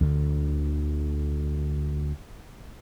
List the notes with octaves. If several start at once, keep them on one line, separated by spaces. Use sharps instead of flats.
D2 D3